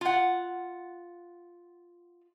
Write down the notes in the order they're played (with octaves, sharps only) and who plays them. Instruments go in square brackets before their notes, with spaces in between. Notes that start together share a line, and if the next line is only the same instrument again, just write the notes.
[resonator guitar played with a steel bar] F4 F#5